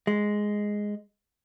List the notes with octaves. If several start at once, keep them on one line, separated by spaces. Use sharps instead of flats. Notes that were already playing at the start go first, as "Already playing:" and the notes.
G#3